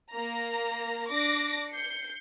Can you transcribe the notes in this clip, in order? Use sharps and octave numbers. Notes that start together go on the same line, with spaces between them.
A#3 A#5
D4 D6 A#6
G6 C7 C#7